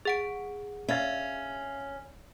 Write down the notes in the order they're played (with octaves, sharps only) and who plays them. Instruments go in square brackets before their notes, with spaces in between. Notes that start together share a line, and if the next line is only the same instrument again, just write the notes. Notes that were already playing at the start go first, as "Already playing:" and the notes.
[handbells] G#4 F#5 D7
[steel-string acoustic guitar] C#4 [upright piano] E5 F5 A6